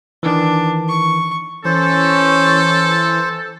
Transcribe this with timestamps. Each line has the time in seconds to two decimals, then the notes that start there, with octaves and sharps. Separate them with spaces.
0.23 D#3 E3 D4
0.88 C#6
1.65 E3 C#4 A4 C5